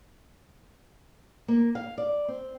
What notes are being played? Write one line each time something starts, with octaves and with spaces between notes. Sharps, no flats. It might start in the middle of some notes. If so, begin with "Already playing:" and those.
A#3
F5
D5
C4